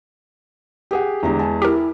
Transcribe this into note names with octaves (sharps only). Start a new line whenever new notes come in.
G4 G#4 F#5
E2 D3 G#3 G4 A#5
G#5 A5
E4 G4 A#4